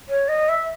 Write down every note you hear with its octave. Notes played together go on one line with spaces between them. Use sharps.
C#5
D#5
E5